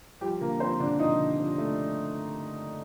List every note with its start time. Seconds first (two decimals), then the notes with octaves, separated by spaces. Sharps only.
0.21 F3 G3 G4
0.41 D3 A#3 A#4
0.60 F3 C4 C5
0.80 D3 D4 D5
0.99 F3 D#4 D#5
1.19 D3
1.39 F3
1.58 A3